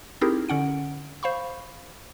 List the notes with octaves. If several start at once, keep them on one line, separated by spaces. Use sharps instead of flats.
C4 D#4 E4 G4 G#4 A#4
D3 C#4 F#5 D7
C5 F5 B5 C#6